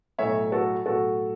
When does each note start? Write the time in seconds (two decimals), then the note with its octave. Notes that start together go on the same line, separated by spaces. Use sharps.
0.19 B1 A2 F#3 A3 C#5 E5
0.52 F#4 A4
0.86 B1 A2 F#3 A3 F#4 A4